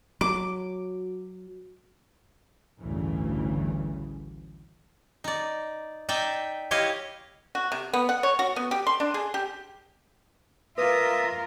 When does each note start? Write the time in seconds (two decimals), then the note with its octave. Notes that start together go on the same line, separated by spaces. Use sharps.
0.21 F#3 D6
2.80 A1 D2 G2 C#3 E3
5.24 D#4 D5
6.09 D#4 D5 E5 G5
6.71 E4 G4 C#5 D#5 F5
7.55 F#4
7.72 C3
7.93 B3
8.09 F#5
8.23 C#5
8.39 F#4
8.56 B3
8.71 G4
8.87 C6
9.00 D4
9.14 G#4
9.34 G4
10.78 A#3 F4 A#4 B4 E5 D#6